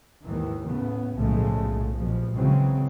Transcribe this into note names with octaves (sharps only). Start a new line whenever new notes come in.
D#2 G#2 D#3 E3
A2 C#3 B3
B1 A2 C#3 F3 G#3 A3
A#1 G2 B2 F3
C#3 E3 F#3 G#3 C4